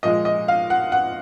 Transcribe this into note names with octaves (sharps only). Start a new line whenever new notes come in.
A#2 F3 G#3 D#5
D#5
F5
F#5
F#5